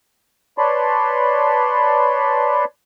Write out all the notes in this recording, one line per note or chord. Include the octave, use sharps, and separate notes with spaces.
B4 C#5 D5 A5 B5 C6